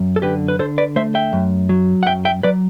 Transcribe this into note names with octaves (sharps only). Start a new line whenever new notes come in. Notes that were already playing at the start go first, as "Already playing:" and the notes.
Already playing: F#2
A4
D3 G4 B4
B4
D3 A4 C5
B4 D5
A3 C5 E5
E5 G5
F#2
F#3
F#5
F#2 E5 G5
E5 G5
F#3 B4 D5